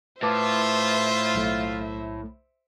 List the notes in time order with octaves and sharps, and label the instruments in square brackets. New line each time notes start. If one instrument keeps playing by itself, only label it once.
[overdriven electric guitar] A2 [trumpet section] F4 [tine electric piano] B4 A5 D6 [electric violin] C5 E5
[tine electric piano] B1 A3